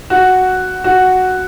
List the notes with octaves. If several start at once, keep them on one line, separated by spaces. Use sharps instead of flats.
F#4
F#4